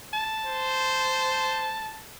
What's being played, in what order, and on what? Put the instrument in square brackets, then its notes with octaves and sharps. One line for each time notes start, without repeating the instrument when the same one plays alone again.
[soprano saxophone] A5
[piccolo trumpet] C5